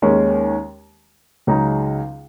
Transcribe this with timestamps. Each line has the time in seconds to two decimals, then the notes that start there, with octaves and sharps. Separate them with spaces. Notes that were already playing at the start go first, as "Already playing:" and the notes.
0.02 D#2 D#3 G#3 C#4
1.47 C#2 C#3 F#3 D#4 G#4